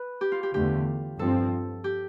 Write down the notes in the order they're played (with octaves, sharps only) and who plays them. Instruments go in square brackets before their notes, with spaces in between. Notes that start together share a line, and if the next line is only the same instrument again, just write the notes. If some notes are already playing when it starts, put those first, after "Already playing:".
Already playing: [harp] B4
G4
F4
G4
[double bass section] E2 D3 A3 [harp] G4
[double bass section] G2 F3 C4 [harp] A4
[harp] G4